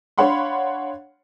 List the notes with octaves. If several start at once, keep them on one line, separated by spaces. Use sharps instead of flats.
D4 C#5 F5 F#5 B5 C6